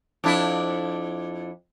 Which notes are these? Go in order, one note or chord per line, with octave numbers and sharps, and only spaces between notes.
F2 D4 E4